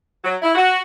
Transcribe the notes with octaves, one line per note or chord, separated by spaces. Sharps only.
F#3
E4
F#4